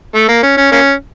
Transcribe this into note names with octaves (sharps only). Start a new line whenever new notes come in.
A3
A#3
C#4
C#4
A#3 C#4